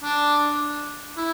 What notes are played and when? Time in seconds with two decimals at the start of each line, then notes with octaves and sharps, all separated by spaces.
0.03 D4
1.17 E4